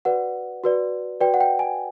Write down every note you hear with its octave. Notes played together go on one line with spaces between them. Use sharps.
F#4 B4 D5 F#5
F#4 B4 D5
F#4 B4 D5 G5
F#5
G5
G#5